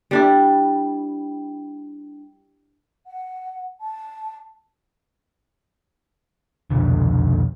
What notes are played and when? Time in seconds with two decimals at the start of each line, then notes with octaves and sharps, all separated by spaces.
0.11 G3 D4 E4
3.07 F#5
3.81 A5
6.70 C2 F2 B2 D3